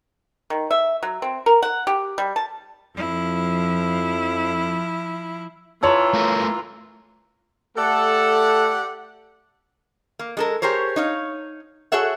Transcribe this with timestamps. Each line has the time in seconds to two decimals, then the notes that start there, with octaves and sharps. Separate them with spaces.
0.50 D#3
0.71 E5
1.03 F#3
1.22 C4
1.46 A#4
1.62 F#5
1.87 G4
2.18 G3
2.36 A5
2.95 F2 F3 E4
5.83 E3 F4 C#5 A5 A#5 C6 E6
6.14 A3 A#4
7.77 A3 G4 A4 D5 F#5
10.19 A#3
10.37 G#3 A4 A#4
10.62 G4 G#4 A#4 C5 C#5
10.96 D#4 C#5 F5
11.92 F#4 G#4 A4 C#5 E5 F#5